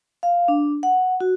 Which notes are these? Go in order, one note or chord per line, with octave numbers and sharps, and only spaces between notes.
F5
D4
F#5
F#4